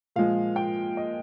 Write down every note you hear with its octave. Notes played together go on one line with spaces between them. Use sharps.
A#2 F3 G#3 F5
G5
D#5